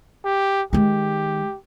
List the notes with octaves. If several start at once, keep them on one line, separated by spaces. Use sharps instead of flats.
G4
D#3 G#3 G4